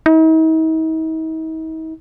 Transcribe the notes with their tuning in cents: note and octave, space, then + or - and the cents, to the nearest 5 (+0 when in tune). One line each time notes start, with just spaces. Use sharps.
D#4 +45